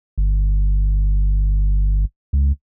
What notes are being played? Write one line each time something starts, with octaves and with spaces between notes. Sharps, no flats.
G1
C#2